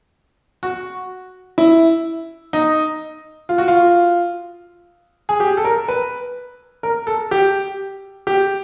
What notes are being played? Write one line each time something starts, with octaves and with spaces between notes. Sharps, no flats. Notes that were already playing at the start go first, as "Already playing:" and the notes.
F#4
E4
D#4
F4
F#4
F4
G#4
G4
A4
A#4
B4
A#4
A4
G4
G4